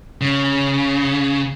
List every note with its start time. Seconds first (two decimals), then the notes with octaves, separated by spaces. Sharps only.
0.21 C#3